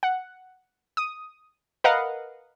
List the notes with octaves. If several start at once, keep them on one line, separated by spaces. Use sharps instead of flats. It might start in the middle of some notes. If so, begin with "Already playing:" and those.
F#5
D#6
A#4 B4 D#5 F5 F#5